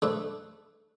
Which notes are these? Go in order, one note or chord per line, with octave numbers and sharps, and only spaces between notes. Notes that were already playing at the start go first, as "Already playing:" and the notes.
A3 D4 B4 E5